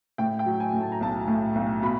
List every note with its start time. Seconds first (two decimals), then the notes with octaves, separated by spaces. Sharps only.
0.18 A2 G5
0.39 G5
0.46 F#3
0.60 G#5
0.73 A2
0.81 A5
0.92 A#5
1.01 B1 A5
1.27 A2
1.55 B1
1.82 B2 B5